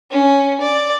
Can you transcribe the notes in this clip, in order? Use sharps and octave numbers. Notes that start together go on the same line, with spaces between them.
C#4
D5